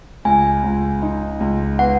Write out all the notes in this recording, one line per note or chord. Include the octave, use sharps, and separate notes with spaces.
C#2 G#5
C#2
D#4
C#2
B3 F#5